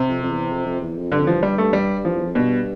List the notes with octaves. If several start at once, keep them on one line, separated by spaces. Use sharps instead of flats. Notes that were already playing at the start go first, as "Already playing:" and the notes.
Already playing: C3
F2
F2
E2
F2
F2
E2
F2
G2 D3
F2
G2 F3
G3
A3
G3
F3
E2
F2
G2 B2